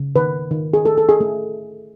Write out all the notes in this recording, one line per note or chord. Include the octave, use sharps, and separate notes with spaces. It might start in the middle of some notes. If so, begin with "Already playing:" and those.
Already playing: C#3
D#3 B4
D#3
G#4
A3 A4
A4
G#4
A3